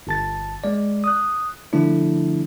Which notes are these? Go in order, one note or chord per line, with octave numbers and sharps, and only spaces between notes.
G1 A5 A6
G#3 D5
D#6 F#6
D3 F3 A3 D4 E4